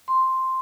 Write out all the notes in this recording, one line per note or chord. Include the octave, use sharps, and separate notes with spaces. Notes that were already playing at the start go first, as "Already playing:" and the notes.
C6